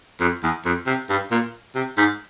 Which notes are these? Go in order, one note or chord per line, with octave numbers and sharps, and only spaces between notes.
F2
E2
F2
C3
G2
A#2
C3
G#2